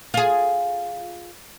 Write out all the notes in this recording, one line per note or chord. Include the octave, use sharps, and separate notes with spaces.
F4 G#4